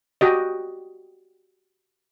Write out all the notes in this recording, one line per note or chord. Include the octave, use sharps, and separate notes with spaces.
F#4 G4 D#5